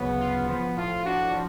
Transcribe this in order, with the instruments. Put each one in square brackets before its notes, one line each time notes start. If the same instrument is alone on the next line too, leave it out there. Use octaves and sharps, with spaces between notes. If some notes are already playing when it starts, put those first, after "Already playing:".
Already playing: [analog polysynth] D2 C#3 F#3 [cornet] B3
[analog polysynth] F4
[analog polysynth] F3 [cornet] B3
[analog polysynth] A2 [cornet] F4
[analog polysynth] D4 [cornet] F#4
[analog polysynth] F3